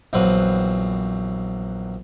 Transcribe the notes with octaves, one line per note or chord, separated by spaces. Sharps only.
A#1 E2 F#3 C4 B4